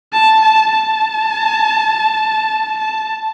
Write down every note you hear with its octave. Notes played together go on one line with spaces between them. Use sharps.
A5
A5
A5
A5